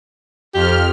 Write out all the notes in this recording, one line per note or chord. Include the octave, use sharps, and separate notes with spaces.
F2 G4 F6